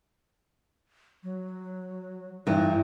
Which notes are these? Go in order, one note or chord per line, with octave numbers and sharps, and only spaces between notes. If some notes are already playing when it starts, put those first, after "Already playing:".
F#3
G2 E3 D#4